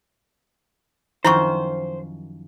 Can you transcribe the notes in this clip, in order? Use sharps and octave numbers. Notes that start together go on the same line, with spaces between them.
F#2 D#3 F3 E4 C5 C#6